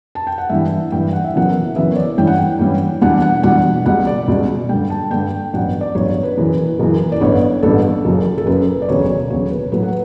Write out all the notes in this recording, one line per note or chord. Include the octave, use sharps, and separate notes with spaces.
A5
G5
F#5
G2 E3 G3 E5
G2 E3 G3 G5
F#5
E5
F#1 F#2 C#3 E3 B3 F#5
F#1 F#2 C#3 E3 B3 E5
C#5
D5
G2 E3 G3 C#4 E4 G5
F#5
G5
G2 E3 G3 C#4 E4
E2 B2 G3 D4 F#5
F#5
E2 B2 G3 D4 F#5
C#2 B2 G3 F#5
D5
C#2 B2 G3
G2 D3 G3 G5
A5
G2 D3 G3 G5
A1 G2 F#3 B3 F#5
D5
A1 G2 F#3 B3 C#5
C#5
B4
F#1 F#2 E3
F#1 F#2 E3
D5
A1 G2 D3 G3 B3 C#5
A1 G2 D3 G3 B3 A4
F#1 F#2 C#3
A4
F#1 F#2 C#3 B4
D5
E1 D2 C#3 F#3 C#5
C#5
E1 D2 C#3 F#3 C#5
B4
A2 F#3 A3 B4
F#5